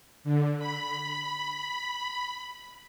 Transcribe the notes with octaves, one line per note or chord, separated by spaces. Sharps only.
D3
B5